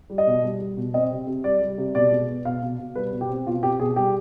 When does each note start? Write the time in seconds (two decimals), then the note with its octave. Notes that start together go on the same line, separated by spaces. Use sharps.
0.10 G3
0.18 D#5
0.27 B2
0.43 G3
0.60 G3
0.77 B2
0.94 C4 D#5
1.10 C3
1.27 C3
1.44 G3 D5
1.61 G3
1.78 C3
1.95 B2 D5
2.12 G#3
2.29 B3
2.45 B2 F5
2.62 B2
2.79 B2
2.95 G3 B4
3.13 B2
3.21 G4
3.29 C4
3.46 B2 F4
3.63 C4 G4
3.79 B2 G#4
3.96 G3 G4